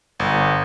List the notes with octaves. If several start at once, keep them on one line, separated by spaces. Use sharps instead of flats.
G1